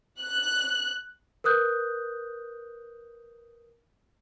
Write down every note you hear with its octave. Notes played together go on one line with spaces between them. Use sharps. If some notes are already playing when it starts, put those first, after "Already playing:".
F#6
A#4 B4 D#6 F#6 G6